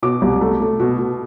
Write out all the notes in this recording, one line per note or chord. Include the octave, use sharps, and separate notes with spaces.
B2 D6
C2
A3
A3
B2
B2